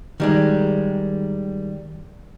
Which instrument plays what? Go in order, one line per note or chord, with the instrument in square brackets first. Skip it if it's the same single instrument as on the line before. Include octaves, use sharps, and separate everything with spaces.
[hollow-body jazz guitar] D#3 G3 G#3